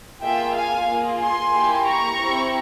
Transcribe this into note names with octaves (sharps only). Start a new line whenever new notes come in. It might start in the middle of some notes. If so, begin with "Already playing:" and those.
A#3 F4 G#4 E5 G5
F5 G#5
A#3 F4 G#4
G#5 C6
A#3 E4 G4
A#5 C#6
C4 E4 G4